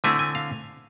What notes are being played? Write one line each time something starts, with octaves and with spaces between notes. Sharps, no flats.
D3 A3 C4 E4 G#5
G#5
F5